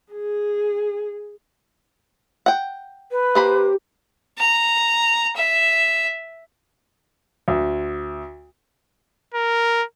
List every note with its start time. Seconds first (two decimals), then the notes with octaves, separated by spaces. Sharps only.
0.13 G#4
2.46 F#5 G5
3.11 B4
3.35 A#3 G4 C5 B5
4.38 A#5
5.37 E5
7.48 D2
9.34 A#4